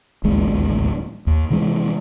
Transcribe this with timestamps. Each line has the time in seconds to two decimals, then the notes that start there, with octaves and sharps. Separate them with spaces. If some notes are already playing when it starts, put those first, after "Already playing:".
0.24 D1 A1 D#2 G#3
1.27 D#2
1.50 C3 E3 G#3